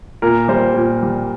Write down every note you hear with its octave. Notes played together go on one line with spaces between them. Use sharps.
A#2 A#4
G3 C5
A#2
G3